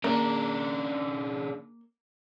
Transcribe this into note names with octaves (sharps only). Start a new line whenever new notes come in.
C#3 A#3 D4